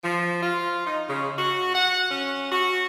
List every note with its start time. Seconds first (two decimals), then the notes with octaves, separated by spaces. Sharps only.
0.04 F3
0.43 F4
0.86 D#4
1.09 C#3
1.38 F#4
1.74 F#5
2.11 C#4
2.52 F#4